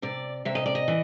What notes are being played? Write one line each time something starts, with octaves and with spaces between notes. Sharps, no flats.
C3 D5
C3 E5
D#5
D5
D#5
E3